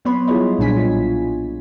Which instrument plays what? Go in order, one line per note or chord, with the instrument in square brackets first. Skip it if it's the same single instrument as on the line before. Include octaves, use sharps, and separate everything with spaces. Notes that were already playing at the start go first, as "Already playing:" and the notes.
[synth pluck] F#3 B3 C#5 B5 C6
G3 E4 F4 G#4 C#5 D#5
B1 A#2 D4 G#5 B6
F4